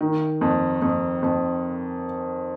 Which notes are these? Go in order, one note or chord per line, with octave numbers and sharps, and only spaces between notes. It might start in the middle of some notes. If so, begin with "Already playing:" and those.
D#3
F2
F2
F2